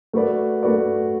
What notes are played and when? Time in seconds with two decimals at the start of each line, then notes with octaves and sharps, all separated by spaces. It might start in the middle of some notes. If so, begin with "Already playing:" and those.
0.13 A3 F#4 B4 D5
0.63 A3 F#4 B4 D5